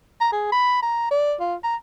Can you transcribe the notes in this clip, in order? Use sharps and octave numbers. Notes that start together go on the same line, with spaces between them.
A#5
G#4
B5
A#5
D5
F4
A#5